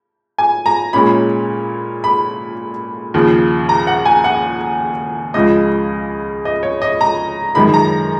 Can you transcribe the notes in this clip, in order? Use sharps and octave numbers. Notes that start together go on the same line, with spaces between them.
G#5
A#5
A#2 G#3 C#4 B5
B5
D#2 C#3 F3
A#5
F#5
G#5
F#5
C#2 C#3 F3 G#3 D#5
D#5
C#5
D#5
A#5
F#2 D#3 G#3 B5
A#5